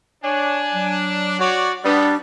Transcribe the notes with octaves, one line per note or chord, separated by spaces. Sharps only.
D4 C#5 G#5
F#3
F#4 C#5 D5
G3 B3 D4 D5